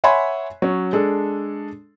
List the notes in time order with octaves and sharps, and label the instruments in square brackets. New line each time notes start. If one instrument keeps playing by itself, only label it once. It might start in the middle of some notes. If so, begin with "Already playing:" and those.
[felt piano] C#5 E5 F#5 G#5 B5 C6
F#3 C#4
G#3 D4 A4